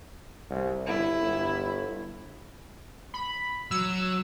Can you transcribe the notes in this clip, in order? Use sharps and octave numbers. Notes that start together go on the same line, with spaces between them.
C2
G1 E4
G1
B5
F#3 E6